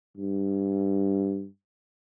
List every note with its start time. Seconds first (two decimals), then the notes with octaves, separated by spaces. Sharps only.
0.17 G2